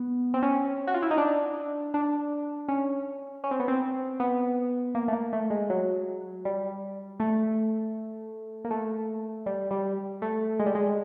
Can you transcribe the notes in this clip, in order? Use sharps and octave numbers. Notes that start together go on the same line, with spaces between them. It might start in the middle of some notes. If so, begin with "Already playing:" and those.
Already playing: B3
C4
C#4
F#4
F4
E4
D#4
D4
D4
C#4
C#4
C4
B3
C4
B3
A#3
A3
A#3
A3
G#3
F#3
G3
A3
A#3
A3
G3
G3
A3
G#3
G3
G#3